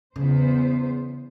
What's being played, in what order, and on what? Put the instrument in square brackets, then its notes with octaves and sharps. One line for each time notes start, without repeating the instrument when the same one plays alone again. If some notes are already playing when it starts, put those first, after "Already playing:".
[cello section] E2 B3 C5 [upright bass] C#3